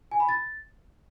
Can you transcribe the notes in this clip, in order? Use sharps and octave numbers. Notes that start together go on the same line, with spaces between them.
G#5
B5
A6